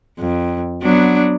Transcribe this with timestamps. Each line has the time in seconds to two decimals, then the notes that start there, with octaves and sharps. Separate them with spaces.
0.20 F2
0.83 F#3 B3 D4